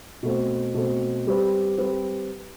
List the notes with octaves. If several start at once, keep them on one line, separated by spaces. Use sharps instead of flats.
B2 A3 C4
B2 A3 C4
G3 C4 G4 B4
G3 C4 G4 B4